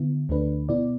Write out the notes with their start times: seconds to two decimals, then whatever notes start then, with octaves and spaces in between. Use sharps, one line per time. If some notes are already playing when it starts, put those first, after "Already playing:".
Already playing: D3 B3 E4
0.29 D2 D3 A3 D4 B4
0.69 B2 B3 E4 D5